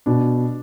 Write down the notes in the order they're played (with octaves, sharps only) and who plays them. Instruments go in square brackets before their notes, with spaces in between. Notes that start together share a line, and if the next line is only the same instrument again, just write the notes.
[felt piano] B2 [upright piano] D4